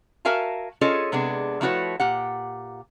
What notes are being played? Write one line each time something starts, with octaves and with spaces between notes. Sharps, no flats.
F#4 A#4 E5 F5 G#5 A5
C#4 F4 G#4 A4 C#5 D#5
C3 G#3 B3 D4 G#4
F3 A3 E4 F#4 B4 C#5
A#2 G4 F#5